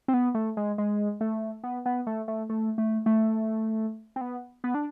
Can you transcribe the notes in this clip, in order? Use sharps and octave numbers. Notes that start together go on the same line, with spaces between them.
C4
B3
A3
G#3
G#3
A3
B3
B3
A3
A3
A3
A3
A3
C4
B3
B3
D4